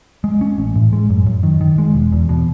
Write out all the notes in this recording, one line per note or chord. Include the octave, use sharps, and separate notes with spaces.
G#3
C#4
A1
A2
G#3
F#2
F#2
D#3
D#3
G#3
E1
E2
B2